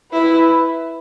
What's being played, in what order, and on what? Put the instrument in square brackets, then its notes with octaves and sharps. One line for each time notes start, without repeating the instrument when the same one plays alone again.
[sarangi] E4 [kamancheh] B4